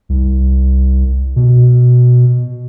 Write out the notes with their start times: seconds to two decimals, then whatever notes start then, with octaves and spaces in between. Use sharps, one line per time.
0.09 C2
1.36 B2